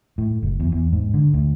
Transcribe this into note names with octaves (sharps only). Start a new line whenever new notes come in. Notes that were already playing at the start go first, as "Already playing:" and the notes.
A2
F#1
E2
E2
G#2
D3
D2